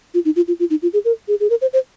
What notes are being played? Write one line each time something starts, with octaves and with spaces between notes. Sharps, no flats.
F4
D#4
F4
F4
F4
D#4
F4
G#4
A#4
G#4
G#4
A#4
C5
C5